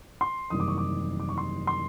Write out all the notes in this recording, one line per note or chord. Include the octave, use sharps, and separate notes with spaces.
C6
F#1 E2 C3 D#3 G3 D#6
D6
C#6
D6
D6
C#6
C6
C6